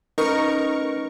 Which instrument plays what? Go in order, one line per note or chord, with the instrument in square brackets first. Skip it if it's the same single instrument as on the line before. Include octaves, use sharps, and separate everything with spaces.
[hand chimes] A3 C#4 A#6 [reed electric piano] D#4 B4 [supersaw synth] A#4 C#6